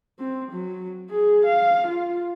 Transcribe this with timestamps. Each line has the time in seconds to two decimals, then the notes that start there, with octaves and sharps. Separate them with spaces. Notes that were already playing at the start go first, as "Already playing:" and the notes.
0.19 C4
0.51 F#3
1.10 G#4
1.45 F5
1.87 F4